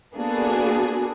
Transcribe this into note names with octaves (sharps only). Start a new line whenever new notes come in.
A#3 B3 D4 F#4 G#4 A4